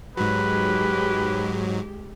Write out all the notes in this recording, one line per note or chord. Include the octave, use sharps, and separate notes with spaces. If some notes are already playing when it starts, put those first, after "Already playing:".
G#2 F#3 G#3 G4 B4